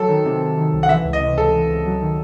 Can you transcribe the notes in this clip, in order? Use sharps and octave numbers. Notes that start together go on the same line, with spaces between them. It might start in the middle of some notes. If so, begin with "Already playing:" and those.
Already playing: F#3 A4
D#3
C3
C3
D#3
C2
F#5
E3 E5
C#2
D#5
C3
C#2 A4
E3
C#2
F#3
D#3